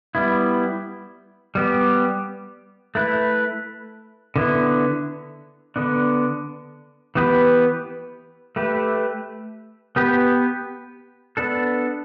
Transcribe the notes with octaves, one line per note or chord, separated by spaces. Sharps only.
G3 B3 E4
G3 B3 G4
A3 E4 B4
D3 B3 E4
D3 B3 D4
E3 B3 G4 B4
A3 G4 B4
B3 G4 B4
B3 D4 A4